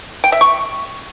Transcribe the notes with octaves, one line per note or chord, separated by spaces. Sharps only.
G5
E5
C#6